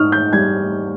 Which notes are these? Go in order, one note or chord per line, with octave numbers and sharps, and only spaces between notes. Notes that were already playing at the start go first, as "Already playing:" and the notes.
Already playing: G#2 C#6 D#6 F6
G6
G3 G#6